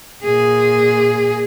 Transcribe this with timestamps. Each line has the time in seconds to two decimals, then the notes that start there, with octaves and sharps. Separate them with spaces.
0.24 A#2 G#4